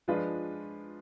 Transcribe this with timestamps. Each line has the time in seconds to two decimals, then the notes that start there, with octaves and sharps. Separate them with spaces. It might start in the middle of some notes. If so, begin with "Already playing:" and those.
0.08 F3 G#3 D4 F4 B4